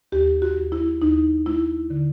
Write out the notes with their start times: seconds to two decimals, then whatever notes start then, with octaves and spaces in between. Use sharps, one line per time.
0.12 D#2 G4
0.42 F#4
0.57 D#2
0.72 E4
1.02 D#2 D#4
1.46 A3 E4
1.90 D3